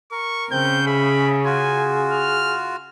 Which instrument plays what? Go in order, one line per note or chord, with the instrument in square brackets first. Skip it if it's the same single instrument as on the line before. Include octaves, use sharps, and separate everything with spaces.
[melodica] A#4 [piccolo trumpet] C#6
[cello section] C#3 [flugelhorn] C4 [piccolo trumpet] G6
[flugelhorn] G#4 [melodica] E5 [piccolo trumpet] B5
[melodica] F4 F#4 [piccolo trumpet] G#5
[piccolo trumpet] F6